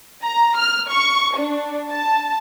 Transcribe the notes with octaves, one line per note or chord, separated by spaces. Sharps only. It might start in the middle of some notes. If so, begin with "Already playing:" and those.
A#5
F6
C#6
D4
A5